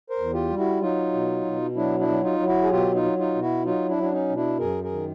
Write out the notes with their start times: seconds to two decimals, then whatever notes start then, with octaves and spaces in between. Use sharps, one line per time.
0.10 A#4 C5
0.19 E2
0.34 F4 G4
0.50 G3
0.58 E4 F#4
0.81 F#3 D#4 F4
1.14 B2
1.45 B2
1.76 F#3 D4 E4
2.00 D4 E4
2.08 F#3
2.23 D#4 F4
2.39 F#3
2.47 E4 F#4
2.63 G#4
2.71 B2 F4 G4
2.94 D#4 F4
3.03 F#3
3.18 D#4 F4
3.34 B2
3.41 E4 F#4
3.65 F#3 D#4 F4
3.89 D4 E4
3.97 F#3
4.03 D4
4.12 C#4 D#4
4.29 B2
4.36 D4 E4
4.59 F#2 G#4 A#4
4.84 G#4 A#4
4.92 D#3